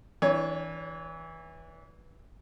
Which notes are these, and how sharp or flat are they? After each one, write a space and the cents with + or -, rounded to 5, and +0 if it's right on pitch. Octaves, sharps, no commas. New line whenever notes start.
E3 -20 D4 -25 C#5 +10